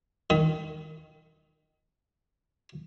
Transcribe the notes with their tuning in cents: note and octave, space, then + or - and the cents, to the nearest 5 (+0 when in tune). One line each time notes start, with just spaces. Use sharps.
D#3 +0 B5 +35 D#6 +45